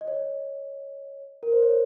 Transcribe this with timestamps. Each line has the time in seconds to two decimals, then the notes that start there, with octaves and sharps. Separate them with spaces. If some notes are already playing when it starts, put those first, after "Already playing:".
0.01 D#5
0.08 C#5
1.43 A#4
1.52 C5
1.62 C#5